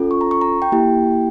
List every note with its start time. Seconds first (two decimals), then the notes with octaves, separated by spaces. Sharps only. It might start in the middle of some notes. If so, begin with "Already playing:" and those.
Already playing: C#4 F4 A4
0.11 C#6
0.21 A#5
0.31 C#6
0.41 A#5
0.62 G5
0.72 A#3 E4 G4